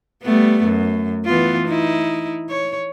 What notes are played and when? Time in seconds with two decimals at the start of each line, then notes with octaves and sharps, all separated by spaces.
0.23 G3 A3 B3
0.64 F#2
1.25 E3 B3 F4
1.68 D#4 E4
2.50 C#5